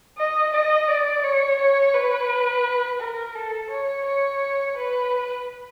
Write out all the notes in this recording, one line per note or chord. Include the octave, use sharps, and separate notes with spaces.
D#5
D#5
D5
C#5
C#5
B4
A#4
A4
C#5
C#5
B4